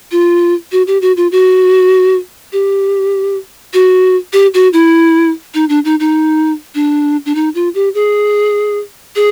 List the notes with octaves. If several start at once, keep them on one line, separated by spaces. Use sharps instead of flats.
F4
F#4
G4
F#4
F4
F#4
G4
F#4
G4
F#4
E4
D#4
D4
D#4
D#4
D4
D4
D#4
F4
G4
G#4
G#4